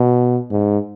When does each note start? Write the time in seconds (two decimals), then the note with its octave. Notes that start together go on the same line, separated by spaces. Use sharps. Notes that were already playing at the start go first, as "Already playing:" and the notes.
Already playing: B2
0.51 G#2